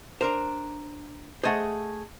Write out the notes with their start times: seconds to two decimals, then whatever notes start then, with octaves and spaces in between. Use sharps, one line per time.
0.21 D4 A#4 C5 A#5
1.44 A3 G#4 C5 D#5 F#5